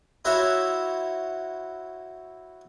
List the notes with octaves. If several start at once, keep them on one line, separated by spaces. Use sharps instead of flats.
E4 F#4 C5 C#5 E5 A#5